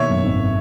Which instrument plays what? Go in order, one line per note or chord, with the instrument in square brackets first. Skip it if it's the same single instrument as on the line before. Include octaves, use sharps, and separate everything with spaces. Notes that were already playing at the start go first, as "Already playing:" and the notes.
Already playing: [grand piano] B2 D#3 A#3 [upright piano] C#5 E5
[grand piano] F#2
G#1